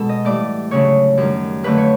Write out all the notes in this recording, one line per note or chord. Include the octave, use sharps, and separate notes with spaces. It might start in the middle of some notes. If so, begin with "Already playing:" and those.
Already playing: B2 G#3 A4
D#5
A2 E3 G3 D5
D2 C#3 F#3 A3 C#5
F#2 D#3 G3
F2 D3 F#3 A3 B4
C#5